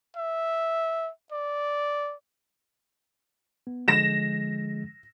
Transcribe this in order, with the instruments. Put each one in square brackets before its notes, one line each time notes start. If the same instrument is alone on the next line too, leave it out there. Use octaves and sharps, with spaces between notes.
[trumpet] E5
D5
[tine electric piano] B3
[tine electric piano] D3 F3 G#3 [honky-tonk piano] A#6 E7